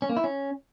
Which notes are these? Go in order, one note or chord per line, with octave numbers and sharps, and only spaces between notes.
C#4
A#3
E4
C#4